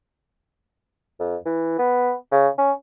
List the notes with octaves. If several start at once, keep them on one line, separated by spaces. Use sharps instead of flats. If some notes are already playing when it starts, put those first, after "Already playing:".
F2
E3
B3
C#3
C#4